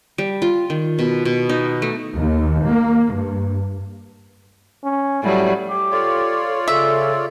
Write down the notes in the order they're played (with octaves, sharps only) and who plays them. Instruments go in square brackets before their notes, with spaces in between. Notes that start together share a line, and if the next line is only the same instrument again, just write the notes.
[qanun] G3
F4
D#3
B2
B2
D#4
A3
[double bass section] D#2
A#3
G2
[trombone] C#4
[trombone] A2 [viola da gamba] F#3 G3
[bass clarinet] G4
[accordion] F4 C#5 D5 [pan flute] A4
[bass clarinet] C#3 [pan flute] A4 [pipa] E5